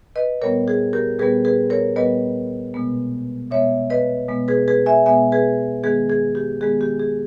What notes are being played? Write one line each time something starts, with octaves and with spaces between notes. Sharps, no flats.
B4 D#5
A#2 G3 B3 A#4 C#5
G#4
G4 A#4
A#2 G3 B3 G#4 B4
G#4 B4
A#4 C#5
A#2 G3 B3 B4 D#5
B2 G#3 B3
B2 G#3 B3 C#5 E5
B4 D#5
B2 G#3 B3
G#4 B4
G#4 B4
E5 G#5
B2 G#3 B3 E5 G#5
G#4 B4
D#3 G#3 B3 G#4
G#4
G4
D#3 G#3 B3 G#4
G4
G#4